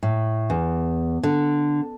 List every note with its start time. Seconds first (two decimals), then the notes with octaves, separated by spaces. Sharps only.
0.03 A2
0.50 E2
1.23 D3